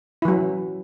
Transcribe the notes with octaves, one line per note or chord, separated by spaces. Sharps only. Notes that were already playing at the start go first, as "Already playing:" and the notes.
E3 F#3 E4